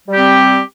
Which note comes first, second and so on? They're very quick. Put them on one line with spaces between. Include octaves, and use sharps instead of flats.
G3 G4 C4